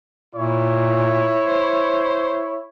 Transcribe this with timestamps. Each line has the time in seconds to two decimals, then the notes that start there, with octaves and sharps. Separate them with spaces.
0.36 A#2 E4 C#5
1.46 C5